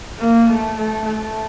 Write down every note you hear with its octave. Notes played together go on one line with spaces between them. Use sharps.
A#3
A3
A3
A3